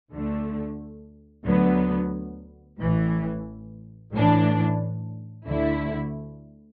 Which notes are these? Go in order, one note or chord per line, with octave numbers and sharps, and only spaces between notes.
D2 D3 A3
D2 D3 F#3 B3
A1 A2 E3
A1 A2 E3 D4
D2 D3 A3 E4